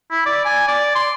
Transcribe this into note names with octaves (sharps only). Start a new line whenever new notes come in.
E4
D5
G#5
D5
C6